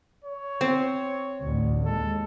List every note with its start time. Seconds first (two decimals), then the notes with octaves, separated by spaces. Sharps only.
0.24 C#5
0.61 C4 C5
1.42 A1 D2
1.85 D#2 G#3 A4